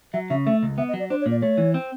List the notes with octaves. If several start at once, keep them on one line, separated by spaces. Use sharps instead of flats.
F#3 E5
C#3 E5
A3 E5
C#2
B3 E5
D#5
F#3
D5
D4 C5
C#5
A#2
D5
A3 C#5
E3
C4